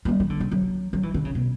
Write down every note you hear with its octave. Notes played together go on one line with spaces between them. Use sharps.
A#3
G3
E3
D3
C#3
F#3
F#3
E3
D3
C#3
B2